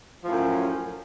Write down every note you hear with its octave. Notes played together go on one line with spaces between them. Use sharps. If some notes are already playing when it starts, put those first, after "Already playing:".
F#2 A2 F3